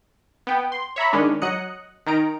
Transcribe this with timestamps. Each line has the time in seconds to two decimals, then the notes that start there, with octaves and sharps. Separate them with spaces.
0.47 B3 G5
0.72 C6
0.96 C#5 E5 A#5 B5
1.13 D#3 G#3 C#4 D4
1.42 F#3 D#5 D#6 F#6 C#7
2.06 D#3 D#4 A#5 D7